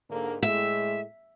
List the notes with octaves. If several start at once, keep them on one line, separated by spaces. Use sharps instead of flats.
G#2 D3 A#3
A2 G#3 E5